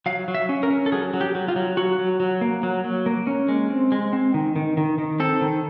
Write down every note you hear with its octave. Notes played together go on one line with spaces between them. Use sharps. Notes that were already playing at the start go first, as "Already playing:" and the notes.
F#3 F5
F#3
E5
C#4
A#4
C#4
A4
F#3 G#4
F#3
G4
F#3
F4
F#3
F#3 F#4
F#3
F#3
A#3
F#3
F#3
A#3
C#4
G#3
C4
G#3
C4
D#3
D#3
D#3
D#3
C4 A4
D#3